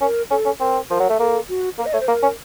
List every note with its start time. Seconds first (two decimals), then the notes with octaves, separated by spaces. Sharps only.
0.01 C#4 A#4
0.31 C#4 A4
0.45 C#4
0.60 C4 A#4
0.90 F3 A#4
1.00 F#3
1.09 A3
1.19 A#3 A4
1.49 F#4
1.79 A#3 A#4
1.86 D#5
1.93 A3 C#5
2.00 C5
2.08 A#3 A#4
2.23 C#4